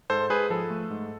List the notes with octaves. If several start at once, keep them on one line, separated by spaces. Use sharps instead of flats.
G#2 A4 C5
G#2 G#4 B4
F3 A4
A3
G#2